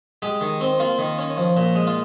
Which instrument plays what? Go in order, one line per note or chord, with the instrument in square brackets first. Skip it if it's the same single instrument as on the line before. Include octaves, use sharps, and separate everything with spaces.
[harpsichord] G#3 G4
D#3
C4
A#3 F4
D#3
C#4
F3
A#2
G#3
F4